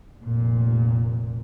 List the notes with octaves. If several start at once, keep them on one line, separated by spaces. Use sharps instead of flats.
F1 A#2